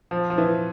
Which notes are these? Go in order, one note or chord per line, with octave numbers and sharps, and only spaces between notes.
F3
F3
E3